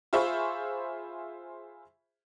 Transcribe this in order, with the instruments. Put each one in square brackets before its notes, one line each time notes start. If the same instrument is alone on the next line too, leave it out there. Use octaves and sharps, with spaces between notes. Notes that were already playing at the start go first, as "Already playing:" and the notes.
[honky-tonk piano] F4 G#4 C5 E5 B5 C#6